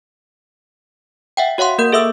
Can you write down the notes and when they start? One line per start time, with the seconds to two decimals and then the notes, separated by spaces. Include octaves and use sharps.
1.37 E5 F#5 G5
1.58 F#4 C#5 F5 F#5 C6
1.78 A#3 A#4 G6
1.92 G#4 A4 E5 D#6 E6